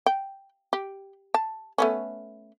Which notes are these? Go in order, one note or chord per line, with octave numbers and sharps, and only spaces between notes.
G5
G4
A5
A3 B3 C#4